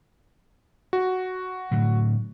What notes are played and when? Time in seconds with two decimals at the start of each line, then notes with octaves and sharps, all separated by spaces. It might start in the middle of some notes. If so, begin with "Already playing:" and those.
0.93 F#4
1.71 A2 D3 F#3